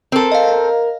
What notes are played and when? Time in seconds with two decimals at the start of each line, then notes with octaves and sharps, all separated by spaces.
0.12 C4 A4 A#4
0.32 D#5 F5